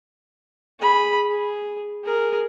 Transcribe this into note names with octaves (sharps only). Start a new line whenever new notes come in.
G#4 B5
G#4
G#4 A#4